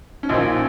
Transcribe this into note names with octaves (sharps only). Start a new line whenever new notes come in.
C#4
A#1 A#2 F3 D#4